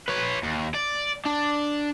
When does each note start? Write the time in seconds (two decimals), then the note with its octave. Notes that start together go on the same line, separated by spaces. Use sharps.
0.08 B4 C#5
0.43 D#2
0.74 D5
1.26 D4